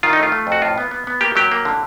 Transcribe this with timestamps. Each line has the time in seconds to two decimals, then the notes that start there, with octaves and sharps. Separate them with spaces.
0.03 D#3 F4
0.13 D#4
0.17 A3
0.23 F4
0.32 A3
0.47 F2 F#4
0.62 A2 F4
0.78 B3
0.91 B3
1.07 B3
1.21 A#3 G4
1.36 F#3 G4
1.52 A#3
1.65 D3